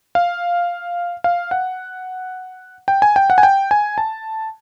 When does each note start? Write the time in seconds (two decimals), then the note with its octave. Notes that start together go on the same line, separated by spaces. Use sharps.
0.15 F5
1.24 F5
1.51 F#5
2.88 G5
3.02 G#5
3.16 G5
3.30 F#5
3.38 G#5
3.43 G5
3.71 G#5
3.98 A5